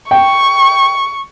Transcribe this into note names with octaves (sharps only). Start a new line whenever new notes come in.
G5 C#6